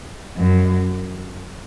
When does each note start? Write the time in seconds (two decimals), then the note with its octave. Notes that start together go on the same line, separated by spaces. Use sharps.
0.37 F#2